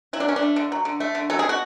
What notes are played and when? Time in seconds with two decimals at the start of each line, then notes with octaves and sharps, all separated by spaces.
0.13 F#3 E4
0.20 D4
0.28 D3 C#4
0.36 D4
0.42 A3
0.56 D3
0.72 F#3
0.85 D3
1.00 A3
1.15 D3
1.30 F#3 A4
1.39 B2 G#4
1.49 F#4